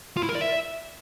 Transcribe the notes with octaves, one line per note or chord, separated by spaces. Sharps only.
F4
E4
A#4
D5
E5